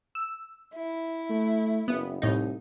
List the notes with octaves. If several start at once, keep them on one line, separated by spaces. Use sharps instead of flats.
E6
E4
A3
F#1 B3
C2 A2 D#4